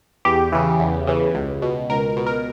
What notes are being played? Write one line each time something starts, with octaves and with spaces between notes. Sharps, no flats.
E2 G4
C#3 E3
E2
C#3 E3
C#2
B2
C#2 A#4
B2
A#4